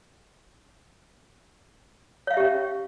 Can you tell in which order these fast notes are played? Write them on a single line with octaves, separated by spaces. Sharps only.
C#5 F5 E5 G4 C#4